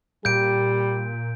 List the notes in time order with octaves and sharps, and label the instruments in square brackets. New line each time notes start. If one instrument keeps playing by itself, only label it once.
[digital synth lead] A#2 [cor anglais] G3 [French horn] G4 [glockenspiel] G6 D7